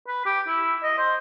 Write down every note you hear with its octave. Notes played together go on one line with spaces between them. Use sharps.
B4
G4
E4
D#5
C5